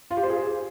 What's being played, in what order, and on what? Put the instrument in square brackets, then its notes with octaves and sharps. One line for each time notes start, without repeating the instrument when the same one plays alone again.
[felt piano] F4
G4
C5
G#4